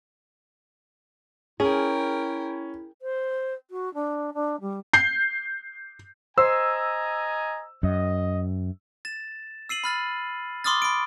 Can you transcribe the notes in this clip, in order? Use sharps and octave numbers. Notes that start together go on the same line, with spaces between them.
C#4 E4 G#4 A#4 G5
C5
F#4
D4
D4
G3
G6 C7
C5 D#5 G#5 A#5 E6
F#2 D#5
A6 E7
E6 C7 D#7 F#7
B5 F6 A6
B5 C6 D6 D#6 F6 A6
B5 D7